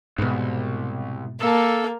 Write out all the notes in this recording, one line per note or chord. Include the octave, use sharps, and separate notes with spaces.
C2 G#2 B2
A#3 A4 A5